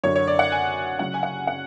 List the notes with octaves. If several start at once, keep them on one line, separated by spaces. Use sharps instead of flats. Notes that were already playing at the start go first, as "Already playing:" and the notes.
F#2 D3 F#3 C#5
C#5
D5
F#5
G#5
C#3 F#3 C#4 F#5
G#5
F#5
F#5